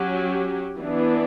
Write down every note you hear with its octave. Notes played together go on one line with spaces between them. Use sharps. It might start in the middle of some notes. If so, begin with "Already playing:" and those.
Already playing: F#3 C#4 G4
E3 B3 D4